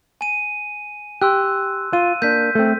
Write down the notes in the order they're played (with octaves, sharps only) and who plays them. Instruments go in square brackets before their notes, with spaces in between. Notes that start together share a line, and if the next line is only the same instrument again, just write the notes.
[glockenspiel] G#5 D#7
[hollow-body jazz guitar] G4 [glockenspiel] C6 E6 F#6
[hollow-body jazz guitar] F4 [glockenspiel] D#7
[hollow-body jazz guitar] A#3 D4 [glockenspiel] G6 B6
[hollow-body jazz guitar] A3 C4